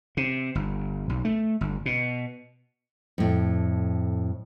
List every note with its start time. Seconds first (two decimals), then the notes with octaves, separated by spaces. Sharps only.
0.17 C3
0.55 G1
1.10 B1
1.25 A3
1.61 G1
1.86 B2
3.18 F2 A2